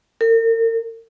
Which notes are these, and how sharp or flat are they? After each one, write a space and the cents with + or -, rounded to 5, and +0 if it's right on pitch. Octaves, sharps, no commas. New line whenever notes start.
A#4 -40